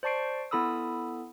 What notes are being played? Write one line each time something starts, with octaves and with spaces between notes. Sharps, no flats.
C5 D5 A5 C#6 C7 D7
B3 E4 A4 B5 D#6 E6